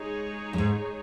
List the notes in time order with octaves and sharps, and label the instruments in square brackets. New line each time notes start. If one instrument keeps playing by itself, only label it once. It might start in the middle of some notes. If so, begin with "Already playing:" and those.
Already playing: [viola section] G#3 D#4 G#4 C#5
[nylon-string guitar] F#2
G#2